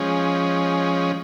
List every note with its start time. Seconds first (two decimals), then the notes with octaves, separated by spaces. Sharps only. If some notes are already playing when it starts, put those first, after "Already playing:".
Already playing: F3 G#3 C#4